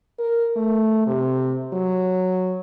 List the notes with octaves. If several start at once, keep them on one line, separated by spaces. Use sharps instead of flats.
A#4
A3
C3
F#3